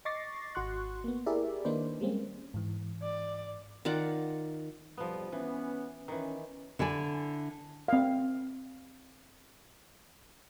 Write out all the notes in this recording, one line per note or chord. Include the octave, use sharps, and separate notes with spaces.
D#5 C#6 D6 A6 A#6 C7
G#1 F#4 C6 C#6 F#6
A#3 B3
E4 G4 G#4 A#4 D5 E5
D#3 A#3 D4 D#4 B4 C5
G3 G#3 A#3 C4 C#4
G#2 E3
D5
D#3 F4 D5 F#5
B1 F2 F3 G3 B3
E3 B3 C#4
D#3 E3 C#4
D3 E4 D5 G#5
C4 F5